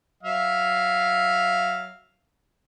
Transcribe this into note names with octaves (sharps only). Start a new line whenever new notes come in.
F#3 E5 F5